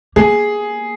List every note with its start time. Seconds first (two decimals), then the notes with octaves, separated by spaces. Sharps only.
0.16 A#3 G#4